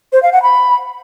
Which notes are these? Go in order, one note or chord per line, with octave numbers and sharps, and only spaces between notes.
C5
F5
F#5
B5